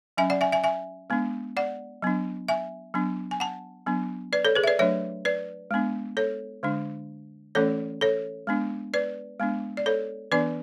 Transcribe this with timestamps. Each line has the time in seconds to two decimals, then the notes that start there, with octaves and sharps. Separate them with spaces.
0.17 F#3 C#4 E5 G#5
0.30 D5 F#5
0.41 E5 G#5
0.52 E5 G#5
0.64 E5 G#5
1.10 G#3 B3 D4
1.57 D5 F#5
2.02 F#3 B3 D4
2.48 E5 G#5
2.94 F#3 B3 D4
3.31 G#5
3.40 F#5 A5
3.86 F#3 B3 D4
4.33 B4 D5
4.45 A4 C#5
4.56 G#4 B4
4.64 E5
4.67 B4 D5
4.79 F#3 A3 D4 C#5 E5
5.25 B4 D5
5.71 G#3 B3 D4
6.17 A4 C#5
6.63 D3 G#3 D4
7.55 E3 A3 C#4 A4 C#5
8.01 A4 C#5
8.47 G#3 B3 D4
8.94 B4 D5
9.40 G#3 B3 D4
9.77 D5
9.86 A4 C#5
10.32 E3 B3 D4 B4 D5